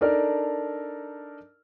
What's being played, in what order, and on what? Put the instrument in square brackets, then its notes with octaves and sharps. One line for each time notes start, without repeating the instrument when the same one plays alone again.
[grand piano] D4 D#4 A4 A#4 D5 F6